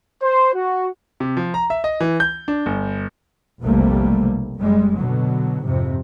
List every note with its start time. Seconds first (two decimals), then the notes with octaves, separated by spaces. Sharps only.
0.22 C5
0.53 F#4
1.20 C3
1.37 F3
1.54 A#5
1.70 E5
1.84 D#5
2.00 E3
2.20 G6
2.48 D4
2.66 G1
3.63 F1 B1 C3 G3 A3 A#3
4.57 F#1 G3 G#3
4.94 B2 D3 F#3
5.63 F2 G#2 C3